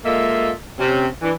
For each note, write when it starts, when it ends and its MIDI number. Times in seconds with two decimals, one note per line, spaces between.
0.05 0.50 56
0.05 0.50 58
0.05 0.50 65
0.05 0.50 69
0.05 0.50 75
0.05 0.50 76
0.79 1.06 48
0.79 1.06 60
0.79 1.06 61
1.22 1.32 52
1.22 1.32 62